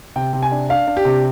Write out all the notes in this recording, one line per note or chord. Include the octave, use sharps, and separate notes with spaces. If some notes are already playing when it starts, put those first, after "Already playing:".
C3 G5
C3
G#5
D4
D4 F5
D4
G4
C3